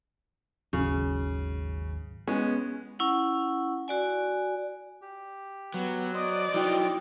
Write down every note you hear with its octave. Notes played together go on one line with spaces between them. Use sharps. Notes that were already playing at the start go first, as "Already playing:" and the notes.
G#1 D#2 C#3 F#3
G#3 B3 C#4
C#4 E4 F#5
F#4 D5 G#5
G4
F#3 B3
C5 D5 D#5 D#6
F#3 D#4 E4 F#4 G5